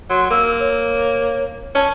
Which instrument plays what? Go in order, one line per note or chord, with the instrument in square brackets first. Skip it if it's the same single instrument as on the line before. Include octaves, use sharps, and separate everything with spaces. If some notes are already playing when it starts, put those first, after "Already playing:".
[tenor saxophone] F#3 [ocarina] C6
[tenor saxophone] A#3 [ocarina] E6
[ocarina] C#5
[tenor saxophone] C#4 [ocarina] A5